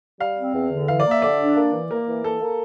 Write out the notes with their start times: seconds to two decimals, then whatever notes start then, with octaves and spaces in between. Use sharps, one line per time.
0.20 G3 F5
0.37 C4
0.54 E2
0.71 D3
0.88 E3 F5
1.00 D5
1.06 A#3
1.11 E5
1.22 D3 D5
1.39 D4
1.56 A#3
1.73 E3
1.91 A#3 A#4
2.08 E3
2.24 A#3 A4
2.41 A#3